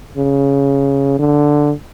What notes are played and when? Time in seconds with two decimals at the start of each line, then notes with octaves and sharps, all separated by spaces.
0.17 C#3
1.19 D3